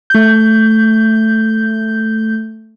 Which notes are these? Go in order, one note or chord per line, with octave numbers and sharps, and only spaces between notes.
A3 G6